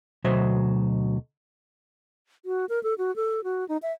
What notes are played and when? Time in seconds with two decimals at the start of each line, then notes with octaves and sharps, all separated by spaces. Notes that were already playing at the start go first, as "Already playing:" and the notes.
0.24 D2 B2 F#3 C5 D#5 E5
2.45 F#4
2.69 A#4
2.83 A4
2.98 F#4
3.16 A4
3.44 F#4
3.69 D#4
3.83 E5